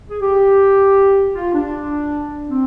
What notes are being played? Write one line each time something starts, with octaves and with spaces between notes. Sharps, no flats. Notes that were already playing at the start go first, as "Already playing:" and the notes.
G#4
G4
F4
D4
C4